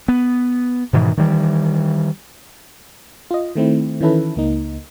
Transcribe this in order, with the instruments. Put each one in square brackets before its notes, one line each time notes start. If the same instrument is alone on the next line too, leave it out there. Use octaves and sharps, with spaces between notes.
[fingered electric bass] B3
G#2 B2 D#3 E3
D#3 E3 G3
[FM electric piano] F4 D#5
D#3 A3 C4 E4
D#3 E3 C#4 E4 A4 B4
C#2 A#3 D#4